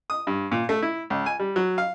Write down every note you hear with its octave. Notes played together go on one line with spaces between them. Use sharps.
D#6
G2
A#2
A3
E4
C#2
G#5
G3
F#3
F5